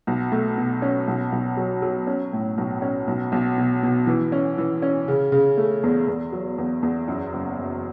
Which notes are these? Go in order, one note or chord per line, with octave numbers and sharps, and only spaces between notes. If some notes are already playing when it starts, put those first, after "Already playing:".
B1
A3
B2
C#4
B1
B1
F#3
F#3
C#4
A2
B1
C#4
B1
B1
B2
B2
E3
C#4
E3
C#4
C#3
C#3
A3
E2
E2
F#3
E2
E2
F#2
F#1
F#1